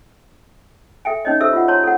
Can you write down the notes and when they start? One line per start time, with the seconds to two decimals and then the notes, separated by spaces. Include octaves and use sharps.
1.05 A4 E5 G5 G#5
1.25 C#4 D#4 C#5 D#5
1.40 F#4 G4 A4 C5 E5 E6
1.53 F4 F#5
1.68 C#5 A5 A#5 C6
1.84 A4 F#5